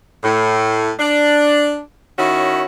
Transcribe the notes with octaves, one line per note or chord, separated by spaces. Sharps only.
A2
D4
D#3 C#4 E4 F#4 C#5